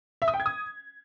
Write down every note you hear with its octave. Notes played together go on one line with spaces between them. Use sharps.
E5
D#6
G5
G#6
D#6